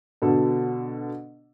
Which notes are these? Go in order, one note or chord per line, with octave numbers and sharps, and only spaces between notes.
B2 D3 A4